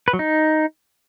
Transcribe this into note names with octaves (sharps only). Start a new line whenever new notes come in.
B4
F#3
D#4